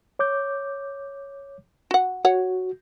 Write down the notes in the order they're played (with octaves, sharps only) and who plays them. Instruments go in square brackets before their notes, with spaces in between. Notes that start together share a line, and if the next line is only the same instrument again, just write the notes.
[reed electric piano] C#5 D6 G6
[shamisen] F#4 F#5
[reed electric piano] F#4 [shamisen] C#5 F#5